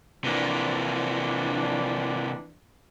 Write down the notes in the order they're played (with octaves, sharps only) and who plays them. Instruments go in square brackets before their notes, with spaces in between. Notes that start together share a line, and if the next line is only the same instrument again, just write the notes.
[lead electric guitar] C3 A#3 [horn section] E3 F3 D4